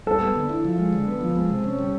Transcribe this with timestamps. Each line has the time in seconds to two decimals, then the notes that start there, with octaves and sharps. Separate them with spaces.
0.06 G3 A4
0.21 B3
0.35 D3
0.49 E4
0.65 F3
0.78 G#3
0.93 D3
1.07 B3
1.21 F3
1.36 G#3
1.50 C3
1.64 C#4
1.79 G3